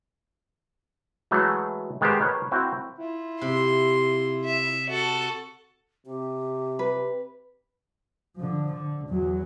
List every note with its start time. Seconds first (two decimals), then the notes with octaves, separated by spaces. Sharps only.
1.31 E3 F#3 G#3 A3
2.01 D#3 G#3 B3 G4 C5
2.21 A#4 B4 C#5
2.52 C4 E4 F#4
2.98 E4 F4
3.41 C3 C6
4.45 E5
4.90 F#4 A4
6.06 C3 G4
6.79 B4
8.36 D3 F3
8.73 D3
9.08 E2 F#3